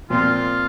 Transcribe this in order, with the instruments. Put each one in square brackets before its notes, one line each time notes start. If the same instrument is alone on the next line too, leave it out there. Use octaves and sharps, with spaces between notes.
[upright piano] A#2 F3 C4 [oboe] F4